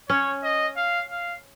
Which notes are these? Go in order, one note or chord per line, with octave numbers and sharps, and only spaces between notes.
C#4 C#5
D#5
F5
F5